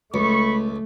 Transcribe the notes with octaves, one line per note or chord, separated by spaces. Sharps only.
C#2 A3 B5 C#6